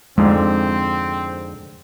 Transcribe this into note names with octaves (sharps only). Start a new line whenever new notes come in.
F2 G#2 D3 G#3 C4